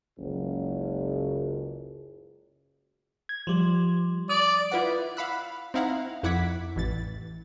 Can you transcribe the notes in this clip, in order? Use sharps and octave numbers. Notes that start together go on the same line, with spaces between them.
F#1 C#2
G#6
F3 G3
D5 D#6
E4 F4 B4 D5 F#5
F5 F#5 B5 E6 F#6
C4 D#4 E4 F5 F#5 A#5
F2 E4 F#5 D6 G#6 B6
A1 E3 A6